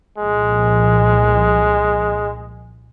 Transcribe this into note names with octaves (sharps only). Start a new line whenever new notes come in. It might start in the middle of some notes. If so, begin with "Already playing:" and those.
C2 A#2 F3 G#3